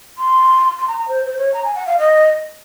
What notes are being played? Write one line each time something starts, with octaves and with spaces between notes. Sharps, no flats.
C6
C6
A#5
A#5
C5
C5
C#5
A#5
G#5
F#5
F5
D#5